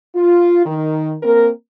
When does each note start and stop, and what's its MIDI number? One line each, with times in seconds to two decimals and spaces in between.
0.15 0.64 65
0.65 1.15 51
1.23 1.50 58
1.23 1.50 60
1.23 1.50 70